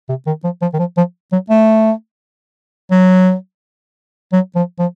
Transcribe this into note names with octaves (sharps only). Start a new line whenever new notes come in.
C3
D#3
F3
F3
D#3
F3
F3
F#3
A3
F#3
F#3
F3
F3